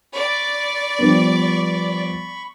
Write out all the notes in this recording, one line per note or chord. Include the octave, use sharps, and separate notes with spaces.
D5 B5 C#6
F3 G3 B3